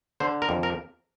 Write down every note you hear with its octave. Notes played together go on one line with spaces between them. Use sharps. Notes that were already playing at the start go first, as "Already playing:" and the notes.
D3 C5
A#4
F2
A#4